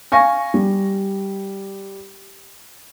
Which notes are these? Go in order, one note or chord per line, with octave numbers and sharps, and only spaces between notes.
F5 G#5 C#6 A#6
G3